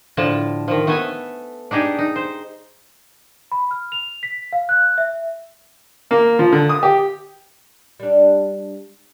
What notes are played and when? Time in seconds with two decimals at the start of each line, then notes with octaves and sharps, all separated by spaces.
0.17 A2 D3 F3 A5
0.68 D#3 F3
0.87 A3 B3 A4 G#5
1.71 D4 D#4 G4 G#4
1.99 D#4
2.16 C5
3.52 B5
3.71 F6
3.92 F7
4.23 B6
4.53 F5
4.69 F#6
4.98 E5
6.11 A#3
6.39 F3
6.52 D3
6.69 D#6
6.83 G4
8.00 G3 D4